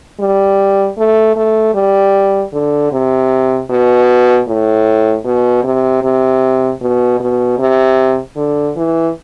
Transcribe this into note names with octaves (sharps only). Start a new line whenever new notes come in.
G3
A3
A3
G3
D3
C3
B2
A2
B2
C3
C3
B2
B2
C3
D3
E3